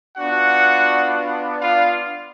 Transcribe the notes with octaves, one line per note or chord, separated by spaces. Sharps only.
B3 D4 F4 F#4 F#5
F4 F5